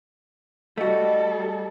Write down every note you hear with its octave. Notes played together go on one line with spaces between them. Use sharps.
G3 A3 F#4 A4 D#5